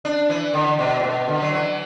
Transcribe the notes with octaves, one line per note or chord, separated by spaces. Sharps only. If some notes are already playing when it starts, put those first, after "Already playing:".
D4
E3
D3
B2
A2
B2
D3
F#3
E3